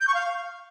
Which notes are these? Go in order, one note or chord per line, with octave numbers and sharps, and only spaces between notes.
G6
C#6
F5